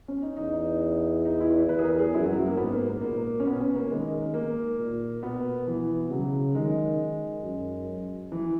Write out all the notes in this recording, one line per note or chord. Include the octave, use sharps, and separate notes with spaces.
C#4
D#4
E2 D#4
D#4
E4
E2 B4
G#4
A#4
G#4
F#2 E4
F#3
F#3
A#3
G#2 B3
A#3
A#2 A#3
C#4
B2 B3
C#4
A#3
D#3 G#3
A#3
A#2
B2 B3
E3
C#3 F#3
D#3 G#3
F#2
E3